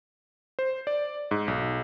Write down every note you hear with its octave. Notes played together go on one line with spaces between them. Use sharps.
C5
D5
G#2
B1